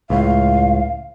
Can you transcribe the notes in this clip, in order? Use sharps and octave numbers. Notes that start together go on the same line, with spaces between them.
C#2 A2 F5